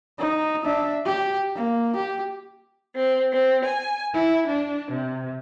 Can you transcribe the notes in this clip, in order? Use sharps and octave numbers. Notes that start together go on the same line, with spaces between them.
D#4
D4 E5
G4
A#3
G4
C4
C4
G#5
E4
D4
C3